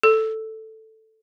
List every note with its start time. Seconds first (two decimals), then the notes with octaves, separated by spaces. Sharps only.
0.03 A4